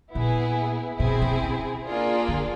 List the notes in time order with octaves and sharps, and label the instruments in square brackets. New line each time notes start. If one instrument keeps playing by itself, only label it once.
[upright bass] A#2 [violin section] B3 E4 G#4
[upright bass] B2 [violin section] C4 E4 G#4
[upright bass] C3
C#3
[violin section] A#3 D4 F4 G#4
[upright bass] D3